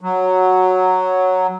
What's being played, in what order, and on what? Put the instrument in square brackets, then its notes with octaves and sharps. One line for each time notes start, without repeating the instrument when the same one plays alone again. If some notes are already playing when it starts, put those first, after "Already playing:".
[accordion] F#3